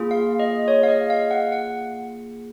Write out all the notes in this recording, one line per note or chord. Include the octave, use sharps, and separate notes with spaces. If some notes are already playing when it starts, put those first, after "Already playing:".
Already playing: A#3 F4 G#4
F5
D#5
C#5
F5
D#5
F5
F#5
F#5